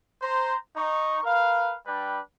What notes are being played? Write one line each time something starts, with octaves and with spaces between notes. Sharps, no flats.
C5 A#5
D#4 C#6
A#4 B4 F5
G3 D4 B4 G5